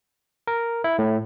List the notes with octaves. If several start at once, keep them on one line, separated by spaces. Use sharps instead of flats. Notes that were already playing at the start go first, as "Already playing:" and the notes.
A#4
E4
A2